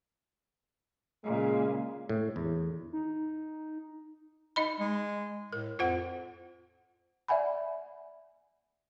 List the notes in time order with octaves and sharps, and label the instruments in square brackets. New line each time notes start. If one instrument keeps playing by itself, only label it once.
[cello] A#2 C#3 [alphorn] G#3
[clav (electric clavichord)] A2
E2
[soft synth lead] D#4
[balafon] D#4 D#5 B5
[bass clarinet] G#3
[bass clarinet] A2 [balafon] A#4
[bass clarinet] F2 [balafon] F4 C5 F#5
[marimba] D5 E5 F#5 G#5 B5